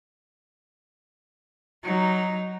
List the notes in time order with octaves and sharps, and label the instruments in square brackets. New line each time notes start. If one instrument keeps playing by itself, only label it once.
[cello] F#3 D#4